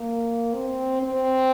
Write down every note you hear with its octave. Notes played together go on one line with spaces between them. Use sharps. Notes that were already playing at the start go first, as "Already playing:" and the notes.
Already playing: A#3
C4
C4